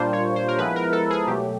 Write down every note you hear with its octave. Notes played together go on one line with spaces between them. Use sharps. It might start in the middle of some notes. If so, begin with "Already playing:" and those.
Already playing: A#2 G3 A#3 D4 F4 C5
C#5
C5
A#4
F3 G#3 B3 E4 B4
A#4
A4
G#4
B2 F#3 A3 G4